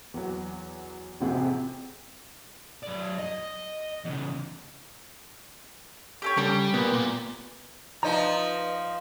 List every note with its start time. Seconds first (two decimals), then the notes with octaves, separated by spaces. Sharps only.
0.14 E2 F#3
1.20 A1 F2 C3 F#4 G#4
2.83 F#2 D5
3.19 D#5
4.04 E2 C#3
6.22 G4 A4 C#5
6.38 C#3 G3 G4 A4
6.74 A#2 B3
6.93 A#2
8.03 F3 D#4 B4 D5 A#5